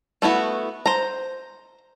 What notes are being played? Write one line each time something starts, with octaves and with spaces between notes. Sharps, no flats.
A3 B3 E4 F#4
C5 A#5